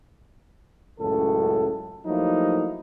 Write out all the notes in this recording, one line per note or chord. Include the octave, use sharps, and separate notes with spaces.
C#2 F#2 A2 A4
F3 F#3 A3 A#3 D#4 E4